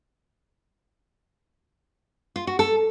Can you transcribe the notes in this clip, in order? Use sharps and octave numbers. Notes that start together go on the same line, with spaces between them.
F4
F#4
A4